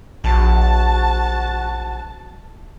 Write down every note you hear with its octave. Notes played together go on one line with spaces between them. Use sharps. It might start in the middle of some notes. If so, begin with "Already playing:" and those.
A#1 F#4 A5